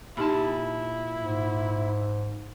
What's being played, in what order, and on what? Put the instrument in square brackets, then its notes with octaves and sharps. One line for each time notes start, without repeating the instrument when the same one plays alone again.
[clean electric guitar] A#2 A5 [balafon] D#4 G4 B5 [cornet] E4
[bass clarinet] G#2